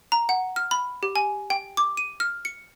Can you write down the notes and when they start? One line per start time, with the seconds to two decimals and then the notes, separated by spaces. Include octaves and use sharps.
0.12 A#5
0.29 F#5
0.56 F6
0.71 B5
1.03 G4
1.16 G#5
1.50 G5
1.77 D6
1.97 D#7
2.20 F6
2.45 C#7